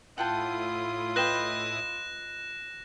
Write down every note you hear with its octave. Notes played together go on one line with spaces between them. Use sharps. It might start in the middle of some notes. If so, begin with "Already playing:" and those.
A2 E4 F4 F#5 G5 A5 D#6
B4 D#5 G5 F#6 A#6 E7